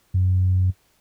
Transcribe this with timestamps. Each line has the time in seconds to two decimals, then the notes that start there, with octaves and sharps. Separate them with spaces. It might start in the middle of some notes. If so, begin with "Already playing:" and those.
0.14 F#2